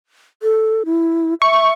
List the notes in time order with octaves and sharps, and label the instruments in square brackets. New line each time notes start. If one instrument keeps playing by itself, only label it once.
[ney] A4
E4
[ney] E5 [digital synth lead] C#6